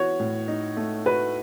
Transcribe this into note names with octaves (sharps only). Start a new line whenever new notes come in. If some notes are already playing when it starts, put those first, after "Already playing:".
Already playing: E3 B3 F#4 C#5
A2
D#4
A3
F#4 B4